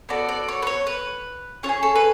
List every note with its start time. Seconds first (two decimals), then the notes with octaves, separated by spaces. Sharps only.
0.09 B3 F#4 A4 D5
0.29 D5
0.48 C#5
0.62 B4
0.67 C#5
0.87 B4
1.63 C#4 F4 C#5
1.69 G#4
1.83 A4
1.95 B4